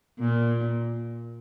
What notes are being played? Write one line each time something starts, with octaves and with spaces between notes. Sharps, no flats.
A#2